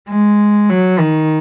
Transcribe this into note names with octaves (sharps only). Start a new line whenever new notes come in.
G#3
F#3
D#3